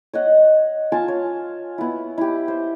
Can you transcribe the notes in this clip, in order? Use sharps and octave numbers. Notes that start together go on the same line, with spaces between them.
C#5 D#5 F#5
F4 F5 G#5 A5
C#5
B3 E4
E4 G4
C5